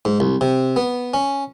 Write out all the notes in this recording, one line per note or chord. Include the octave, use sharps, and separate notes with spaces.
G#2
C2
C3
B3
C#4